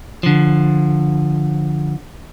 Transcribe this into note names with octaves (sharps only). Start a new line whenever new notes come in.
D3 F3